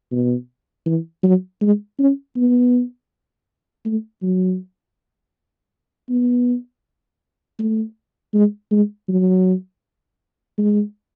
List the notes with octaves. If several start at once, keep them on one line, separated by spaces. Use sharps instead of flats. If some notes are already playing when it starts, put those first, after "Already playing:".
B2
E3
F#3
G#3
C#4
B3
A3
F#3
B3
A3
G#3
G#3
F#3
G#3